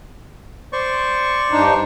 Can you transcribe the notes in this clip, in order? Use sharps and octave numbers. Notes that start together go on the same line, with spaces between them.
C5 D5 C#6
G2 D4 D#4